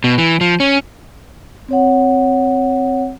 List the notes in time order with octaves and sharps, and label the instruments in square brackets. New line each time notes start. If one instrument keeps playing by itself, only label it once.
[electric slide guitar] B2
E3
F3
C#4
[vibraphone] C4 C#5 F#5